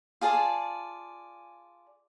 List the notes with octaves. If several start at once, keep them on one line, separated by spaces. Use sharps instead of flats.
F4 G#4 D5 A5